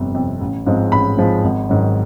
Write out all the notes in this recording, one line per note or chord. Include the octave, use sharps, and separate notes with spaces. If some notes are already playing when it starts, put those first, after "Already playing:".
Already playing: G1 F2 C3
F2 C3
A1
G#2 F3 G#3 C4
A1 B5
G#2 F3 G#3 C4
G#1
G#2 D#3 F#3